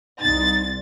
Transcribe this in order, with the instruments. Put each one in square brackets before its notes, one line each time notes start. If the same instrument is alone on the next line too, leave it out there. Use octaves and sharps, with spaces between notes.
[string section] C2 A6 [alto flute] D#4